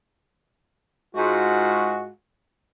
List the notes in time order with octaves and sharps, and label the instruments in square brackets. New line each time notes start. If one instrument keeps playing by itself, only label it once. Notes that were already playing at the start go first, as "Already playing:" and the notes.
[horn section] G#2 G#3 F4 F#4